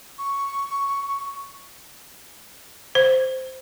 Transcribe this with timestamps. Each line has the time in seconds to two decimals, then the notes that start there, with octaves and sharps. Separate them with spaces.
0.18 C#6
2.95 C5